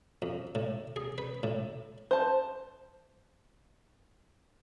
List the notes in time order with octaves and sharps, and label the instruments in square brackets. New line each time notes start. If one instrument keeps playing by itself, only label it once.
[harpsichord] F2
A2
G#4
B4
A2
[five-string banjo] C5 A5